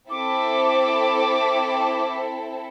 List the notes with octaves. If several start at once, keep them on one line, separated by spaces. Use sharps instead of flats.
C4 E4 A4 D6